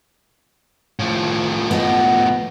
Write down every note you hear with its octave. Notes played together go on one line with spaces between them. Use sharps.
A2 F3
B3 D#5